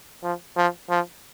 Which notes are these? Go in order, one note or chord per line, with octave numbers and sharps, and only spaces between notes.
F3
F3
F3